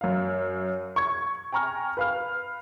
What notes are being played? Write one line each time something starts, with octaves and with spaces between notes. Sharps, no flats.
F#2 F5
C#6 G#6
G5 G#5 A#5 C#6 F6
B4 F5 F6